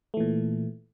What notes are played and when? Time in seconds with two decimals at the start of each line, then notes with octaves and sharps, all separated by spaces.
0.14 A3
0.17 E3
0.20 A#2